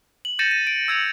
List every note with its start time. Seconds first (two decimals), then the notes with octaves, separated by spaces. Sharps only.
0.25 F#7
0.39 G6 A6 A#6 C#7 D#7 E7
0.51 D#7
0.67 D7
0.88 E6 G#6 C#7 F7